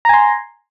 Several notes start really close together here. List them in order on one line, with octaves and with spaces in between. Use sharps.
A#5 G#5 C6